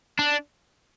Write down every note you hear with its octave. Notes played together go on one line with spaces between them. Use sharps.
D4